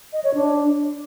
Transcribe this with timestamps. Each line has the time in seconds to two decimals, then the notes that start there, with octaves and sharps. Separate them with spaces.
0.13 D#5
0.24 C#5
0.34 D4